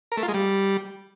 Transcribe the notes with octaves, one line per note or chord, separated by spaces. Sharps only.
A#4
A3
F4
G#3
G3